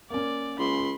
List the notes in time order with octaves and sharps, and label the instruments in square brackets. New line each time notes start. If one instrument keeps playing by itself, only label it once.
[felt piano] A#3 C#4 [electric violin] D5
[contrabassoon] C#2 [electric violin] B5 C6